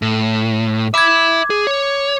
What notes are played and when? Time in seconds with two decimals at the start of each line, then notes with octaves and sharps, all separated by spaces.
0.02 A2
0.94 E5 B5 D6 G#6
1.50 G#4
1.67 C#5